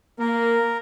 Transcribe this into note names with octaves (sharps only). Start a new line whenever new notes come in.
A#3 A#4